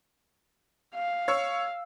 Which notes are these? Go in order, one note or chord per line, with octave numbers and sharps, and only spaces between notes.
F5
C#5 E6